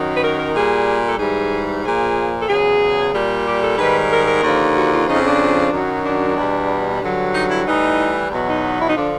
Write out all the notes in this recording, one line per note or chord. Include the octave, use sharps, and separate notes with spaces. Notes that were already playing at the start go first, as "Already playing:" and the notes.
Already playing: F#2 D#3 F#3
B4
A#4
A#4
A#2 G3 G#4
A4
G#2 E3 G3 G#4
A#2 F3 G#4
A4
E2 C#3 F#3 G#4
A#2 G3
G4
A4
G#2 D#3 G3 B4
A#4
A#4
D#2 D3 F3
F#4
F4
F2 C#3 F3 D#4
D4
F#2 D#3 F#3
D4
E2 B2 G3
G2 D3 F#3
D#4
E4
A2 E3 G3 D#4
E2 B2 F#3
D#4
E4
D#4
D3 F3 D4